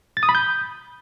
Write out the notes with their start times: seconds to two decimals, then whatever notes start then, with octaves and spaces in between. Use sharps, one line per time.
0.17 A6
0.23 D#6
0.29 B5
0.35 G6